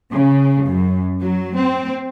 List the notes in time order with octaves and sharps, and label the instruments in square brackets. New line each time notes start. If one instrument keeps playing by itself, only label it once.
[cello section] C#3
F#2
F#3
C4